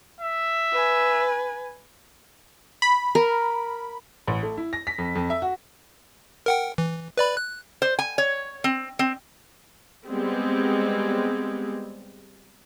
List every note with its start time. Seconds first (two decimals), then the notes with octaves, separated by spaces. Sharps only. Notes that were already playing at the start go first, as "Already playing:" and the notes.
0.20 E5
0.73 B4 G#5
2.82 B5
3.15 A#4
4.28 A1
4.43 A3
4.57 E4
4.73 A#6
4.87 B6
4.98 F2
5.15 F2
5.30 E5
5.42 F#4
6.46 A#4 F#5 G5
6.78 E3
7.17 B4 D5 B5
7.37 F#6
7.82 C5
7.99 G#5
8.18 C#5
8.64 C4
8.99 C4
10.07 G3 G#3 B3 C4